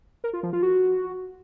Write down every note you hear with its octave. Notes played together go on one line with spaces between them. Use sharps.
A#4
F4
F3
F4
F#4